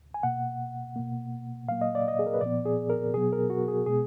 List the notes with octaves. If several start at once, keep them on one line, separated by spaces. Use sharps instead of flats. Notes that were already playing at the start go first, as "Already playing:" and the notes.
Already playing: D2
G#5
B2 A#3 F#5
B2 A#3
A#2 F#3 A#3 F5
D#5
D5
D#5
G#4
A#4
B4
A#2 F3 B3 D5
G#4
A#4
B2 F#3 B3 G#4
A#4
F#4
G#4
B2 G#3 B3 G#4